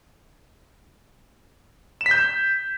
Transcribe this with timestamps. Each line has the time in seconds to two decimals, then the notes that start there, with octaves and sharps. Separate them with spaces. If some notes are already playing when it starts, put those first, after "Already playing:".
2.01 E7
2.06 B6
2.11 G6